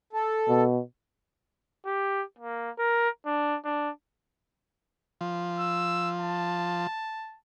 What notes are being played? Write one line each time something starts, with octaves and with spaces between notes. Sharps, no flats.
A4
B2
G4
A#3
A#4
D4
D4
F3
E6
A5